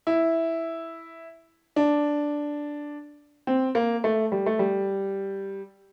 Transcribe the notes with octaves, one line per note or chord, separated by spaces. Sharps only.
E4
D4
C4
A#3
A3
G3
A3
G3